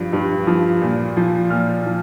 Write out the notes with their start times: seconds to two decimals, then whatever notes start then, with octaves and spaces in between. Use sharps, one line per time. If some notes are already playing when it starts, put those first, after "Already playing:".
Already playing: G2 F3
0.13 G2
0.47 F3
0.81 A#2
1.17 F3
1.50 A#2 F6
1.86 F3